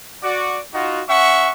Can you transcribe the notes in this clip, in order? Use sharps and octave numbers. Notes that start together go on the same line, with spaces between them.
F#4 D5
D#4 F4 F#4
C#4 E5 F#5 C#6